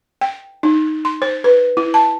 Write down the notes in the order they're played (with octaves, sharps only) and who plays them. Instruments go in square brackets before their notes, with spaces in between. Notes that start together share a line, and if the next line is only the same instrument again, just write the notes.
[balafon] G5
D#4
C6
C5
B4
E4
A5